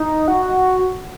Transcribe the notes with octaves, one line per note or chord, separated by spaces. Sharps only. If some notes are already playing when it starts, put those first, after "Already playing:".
Already playing: D#4
F#4